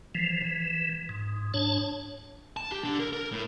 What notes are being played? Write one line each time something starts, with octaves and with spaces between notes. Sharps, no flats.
E3 F3
E3
G#2
G#2 D4 C#5 A5
A5
G4
D3
A#4
A#4
A2